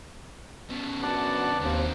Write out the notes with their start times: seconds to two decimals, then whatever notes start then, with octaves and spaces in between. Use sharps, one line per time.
0.70 C#3 B3
1.03 F#2 D4 F#4 B4 F#5 A5
1.61 D#2 D#3 C4 C5